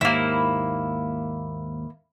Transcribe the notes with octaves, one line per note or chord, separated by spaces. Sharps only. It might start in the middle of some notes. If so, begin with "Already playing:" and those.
D#2 G#2 A#3 E4